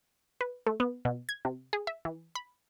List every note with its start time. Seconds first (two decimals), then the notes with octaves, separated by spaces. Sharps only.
0.41 B4
0.67 A3
0.80 B3
1.05 B2
1.29 G#6
1.45 C3
1.73 G#4
1.87 E5
2.05 E3
2.35 B5